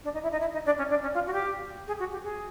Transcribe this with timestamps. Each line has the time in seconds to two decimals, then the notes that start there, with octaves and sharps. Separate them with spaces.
0.04 D4
0.14 D#4
0.23 E4
0.32 D#4
0.41 E4
0.53 D#4
0.65 D4
0.78 C#4
0.89 D4
1.02 C#4
1.14 F4
1.27 F#4
1.33 G4
1.87 G#4
1.99 F#4
2.12 G4
2.23 G#4